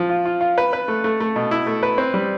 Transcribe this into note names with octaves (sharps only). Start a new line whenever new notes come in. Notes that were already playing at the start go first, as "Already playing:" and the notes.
Already playing: F3
F4
F4
F4
B4
B4
A3
A3
A3
B2
E4
A3
B4
C4
G3